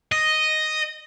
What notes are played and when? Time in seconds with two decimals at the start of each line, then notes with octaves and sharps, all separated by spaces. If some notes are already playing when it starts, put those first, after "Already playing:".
0.12 D#5